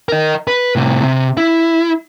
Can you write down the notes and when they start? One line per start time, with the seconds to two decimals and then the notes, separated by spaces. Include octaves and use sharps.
0.09 A#4 D#5
0.48 B4
0.76 A2 C3
1.04 C3
1.37 E4